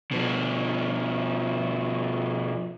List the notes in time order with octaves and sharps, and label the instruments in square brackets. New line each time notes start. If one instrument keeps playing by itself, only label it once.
[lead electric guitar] B2 F3